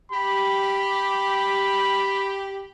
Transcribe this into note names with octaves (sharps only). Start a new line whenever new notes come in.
G4 B5